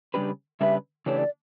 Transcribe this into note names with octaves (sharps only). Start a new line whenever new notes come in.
C#3 G3 D4 G4 B4
C#3 G3 D4 G4 B4 E5
C#3 E3 A3 D4 G4 C#5
D5